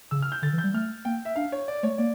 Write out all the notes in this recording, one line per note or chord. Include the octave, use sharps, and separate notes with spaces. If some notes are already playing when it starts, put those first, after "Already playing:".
C#3 E6
F6
G6
D3 A6
E3
G6
G3
A3 F6
A#3 G5
E5
D4 F5
C#5
D5
A3 C#5
A#3 D5